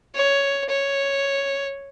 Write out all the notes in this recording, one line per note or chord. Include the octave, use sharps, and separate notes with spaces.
C#5
C#5